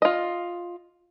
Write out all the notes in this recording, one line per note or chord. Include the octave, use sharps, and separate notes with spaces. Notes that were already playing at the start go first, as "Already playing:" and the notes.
F4 D#5